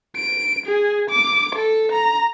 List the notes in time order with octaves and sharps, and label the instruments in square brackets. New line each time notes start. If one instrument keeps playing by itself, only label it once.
[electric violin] D7
G#4
D6
A4
A#5